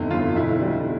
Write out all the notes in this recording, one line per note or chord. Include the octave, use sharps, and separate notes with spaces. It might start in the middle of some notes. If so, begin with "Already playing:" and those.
Already playing: G1 F2 C3 D#4 E4
G1 F4
B1 E4
G3